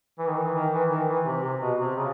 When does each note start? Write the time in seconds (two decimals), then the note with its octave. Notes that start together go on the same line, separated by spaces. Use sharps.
0.19 E3
0.27 D#3
0.36 E3
0.54 D#3
0.73 E3
0.90 D#3
1.08 E3
1.26 C3
1.43 C3
1.61 B2
1.79 C3
1.96 C#3